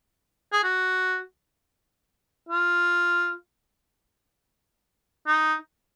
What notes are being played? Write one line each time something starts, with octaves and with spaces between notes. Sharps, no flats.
G#4
F#4
F4
D#4